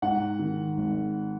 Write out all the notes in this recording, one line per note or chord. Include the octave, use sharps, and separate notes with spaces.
G#2 F#5
D#3
G#1